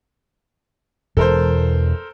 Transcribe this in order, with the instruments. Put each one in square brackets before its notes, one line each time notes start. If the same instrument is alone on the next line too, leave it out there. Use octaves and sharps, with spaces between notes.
[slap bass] E1 E2 [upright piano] A4 A#4 C5